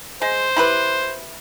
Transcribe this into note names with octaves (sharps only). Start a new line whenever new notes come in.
G#3 C5
E4 G4 B4